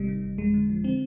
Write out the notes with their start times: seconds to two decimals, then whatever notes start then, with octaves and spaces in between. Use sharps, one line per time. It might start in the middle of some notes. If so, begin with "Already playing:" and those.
Already playing: G#1 C3 G3
0.08 D#3
0.24 G#1
0.38 F2 G#3
0.54 D3
0.70 F3
0.84 D3 C4